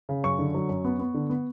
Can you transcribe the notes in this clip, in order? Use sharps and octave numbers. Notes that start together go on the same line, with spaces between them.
C#3
F#2 C#6
D3
F#3
F#2
B3
B3
D3
B3